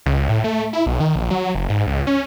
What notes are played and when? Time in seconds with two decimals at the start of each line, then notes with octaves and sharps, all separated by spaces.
0.06 C#2
0.29 A2
0.44 A3
0.73 E4
0.86 B1
1.00 D#3
1.16 A#1
1.31 F#3
1.55 F#1
1.69 G#2
1.87 C#2
2.07 C#4